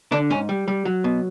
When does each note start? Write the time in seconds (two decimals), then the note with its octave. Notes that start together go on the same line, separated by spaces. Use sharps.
0.12 D3 D4
0.30 G#2 C#4
0.49 G3
0.68 G3
0.85 F#3
1.04 B2